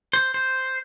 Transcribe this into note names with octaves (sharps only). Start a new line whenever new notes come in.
C5
C5